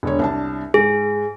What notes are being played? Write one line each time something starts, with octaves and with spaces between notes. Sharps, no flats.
E1 D3 C#5
C2 D4 A5
G#2 G#4